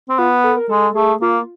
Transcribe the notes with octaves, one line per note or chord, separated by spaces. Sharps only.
C4
B3 F4
A4
A#4
G#3 A4
A3 G#4
A#3 F4